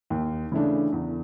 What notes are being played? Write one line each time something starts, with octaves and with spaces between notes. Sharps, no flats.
D#2
C#3 E3 A3 D4
E2